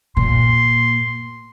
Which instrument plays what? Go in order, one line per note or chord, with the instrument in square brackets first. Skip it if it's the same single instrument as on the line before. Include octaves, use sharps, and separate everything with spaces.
[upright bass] A#2 [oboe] C6